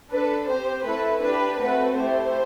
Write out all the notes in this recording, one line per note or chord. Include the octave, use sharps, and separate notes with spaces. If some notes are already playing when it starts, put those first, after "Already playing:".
D4 A4 B4
C4 G4 C5
A3 C4 E4 A4 B4
D4 G4 B4
A3 C4 F#4 A4 B4
A3 E4 G4 C5